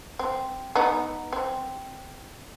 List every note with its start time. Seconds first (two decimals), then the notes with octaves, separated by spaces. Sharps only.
0.19 C4
0.76 B3 D#4
1.33 C4